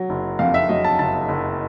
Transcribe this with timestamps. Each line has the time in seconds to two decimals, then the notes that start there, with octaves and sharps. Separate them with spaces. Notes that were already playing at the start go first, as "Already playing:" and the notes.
Already playing: F#3
0.09 F#1
0.39 F2 F5
0.54 E5
0.69 F#3 D#5
0.84 A5
0.99 F#1 A5
1.28 F#1